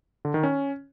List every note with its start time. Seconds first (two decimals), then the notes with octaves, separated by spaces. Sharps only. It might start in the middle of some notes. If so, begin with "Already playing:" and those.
0.25 D3
0.34 D#3
0.43 C#4